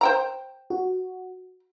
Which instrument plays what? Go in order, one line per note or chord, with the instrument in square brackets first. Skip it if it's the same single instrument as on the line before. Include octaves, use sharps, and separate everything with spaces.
[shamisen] C5 G5 A#5
[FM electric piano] F#4